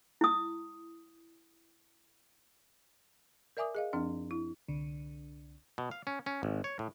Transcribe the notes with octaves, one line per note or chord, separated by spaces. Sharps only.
E4 D#6
A#4 D5 E5 G#5 D6 D#6
G#4 D#5 F5
F#2 F3 C4 D4
E4
C2 D3
B2
F5
C#4
C#4
G#1
C#5
A2